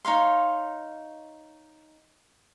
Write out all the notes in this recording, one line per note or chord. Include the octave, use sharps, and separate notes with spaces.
D#4 C#5 F5 C6